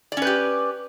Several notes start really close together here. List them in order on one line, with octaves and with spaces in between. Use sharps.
D5 C#4 B4 G4